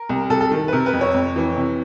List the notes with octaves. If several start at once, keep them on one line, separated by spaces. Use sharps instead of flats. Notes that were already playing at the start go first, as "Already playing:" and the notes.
Already playing: A#4
C2
C2 A4
A4
D#3
B4
C3 A#4
B4
F2
C#5
F2
E3
C3